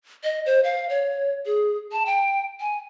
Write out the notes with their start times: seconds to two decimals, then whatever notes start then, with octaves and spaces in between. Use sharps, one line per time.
0.24 D#5
0.46 C5
0.64 F5
0.90 C#5
1.46 G#4
1.92 A5
2.06 G5
2.60 G#5